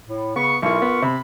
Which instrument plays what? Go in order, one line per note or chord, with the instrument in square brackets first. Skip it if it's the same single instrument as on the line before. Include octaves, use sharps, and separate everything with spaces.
[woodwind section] A2
[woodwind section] C#3 B5 C#6 [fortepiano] B3
[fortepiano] B1 E4 [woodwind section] F4 A#4 C#6
[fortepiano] B3
[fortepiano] C3 [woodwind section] B5